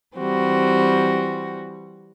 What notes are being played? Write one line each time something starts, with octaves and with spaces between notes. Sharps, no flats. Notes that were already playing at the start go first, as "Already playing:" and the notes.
E3 G3 C4 F#4